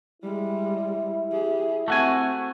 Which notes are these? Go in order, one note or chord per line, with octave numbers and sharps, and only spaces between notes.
G3 G#3 E4
G4 G#4
A3 C4 F#4 G#5